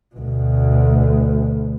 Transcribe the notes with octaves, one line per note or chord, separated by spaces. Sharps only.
D2 B2